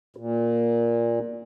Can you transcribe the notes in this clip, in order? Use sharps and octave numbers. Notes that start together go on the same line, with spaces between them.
A#2